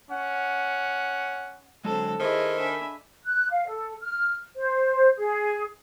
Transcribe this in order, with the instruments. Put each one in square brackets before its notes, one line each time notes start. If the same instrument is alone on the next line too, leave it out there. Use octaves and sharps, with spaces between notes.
[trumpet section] C#4 F#5
[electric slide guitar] D3 F#3 G#3 [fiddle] C4 A4
[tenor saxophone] D#3 [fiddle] E4 [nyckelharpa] G#4 D#5 [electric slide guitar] C5
[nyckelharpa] D4 E5 [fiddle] G#5 B5
[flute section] F#6
F5
A4
F6
C5
G#4